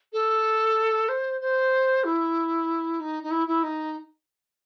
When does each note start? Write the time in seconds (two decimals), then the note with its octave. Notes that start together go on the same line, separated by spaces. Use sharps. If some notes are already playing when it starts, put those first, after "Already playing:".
0.13 A4
1.09 C5
1.41 C5
2.04 E4
3.00 D#4
3.23 D#4
3.31 E4
3.48 E4
3.63 D#4